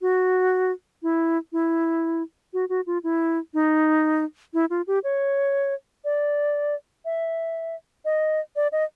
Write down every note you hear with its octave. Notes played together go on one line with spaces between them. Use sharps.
F#4
E4
E4
F#4
F#4
F4
E4
D#4
E4
F4
G4
C#5
D5
E5
D#5
D5
D#5